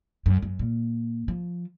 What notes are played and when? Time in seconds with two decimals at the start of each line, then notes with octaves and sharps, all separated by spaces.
0.26 F#2
0.42 F#2
0.59 A#2
1.28 F3